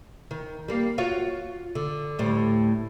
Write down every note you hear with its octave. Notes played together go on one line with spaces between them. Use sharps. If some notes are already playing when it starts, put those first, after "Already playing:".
D#3
G3 A#3
F4 F#4 C#5
D3
D2 A2 G3